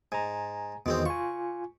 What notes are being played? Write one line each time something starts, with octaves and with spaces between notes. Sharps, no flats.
G#2 G#5 A#5
E2 B2 D#3 G#3 C4
F4 G#5 C#6